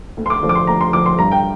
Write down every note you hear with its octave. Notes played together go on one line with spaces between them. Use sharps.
D2
C6
D6
D3 F3 A3
D6
C6
D2 A#5
C6
D3 F3 A3 D6
C6
G2 A#5
G5